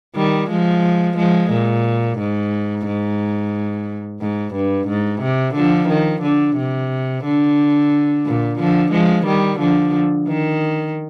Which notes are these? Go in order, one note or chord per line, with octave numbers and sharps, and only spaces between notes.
D#3 G3
F3 G#3
F3 G#3
A#2
G#2
G#2
G#2
G2
G#2
C3
D3 F3
D#3
D3
C3
D3
A#2
D3 F3
F3 G#3
D#3 G3
D3 F3
D#3